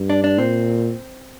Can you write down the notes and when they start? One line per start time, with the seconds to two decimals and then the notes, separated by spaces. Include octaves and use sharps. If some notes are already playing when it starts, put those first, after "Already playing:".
Already playing: G2
0.10 D4
0.24 D4
0.38 A#2 C4